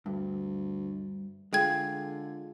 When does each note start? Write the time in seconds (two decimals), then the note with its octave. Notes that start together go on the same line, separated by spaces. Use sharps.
0.06 D2 G2
1.53 D3 G#3 F4 G#4 G5 G#6